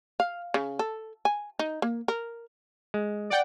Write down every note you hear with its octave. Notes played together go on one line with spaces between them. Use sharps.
F5
C#3
A4
G#5
D#4
A#3
A#4
G#3
D5 F#5 G5